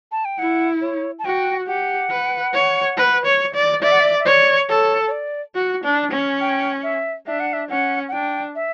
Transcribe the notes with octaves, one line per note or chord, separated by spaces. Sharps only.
A5
G5
E4 F#5
C#5
A5
F#4 G5
G4 F#5
B4
C#5
B4
C#5
D5
D5 E5
F#5
E5
E5
C#5 D5
A4 C#5
C#5
D5
F#4
D4
C#4
G5
E5
D4 E5
F#5
E5
C#4 F#5
F#5
D4 G5
E5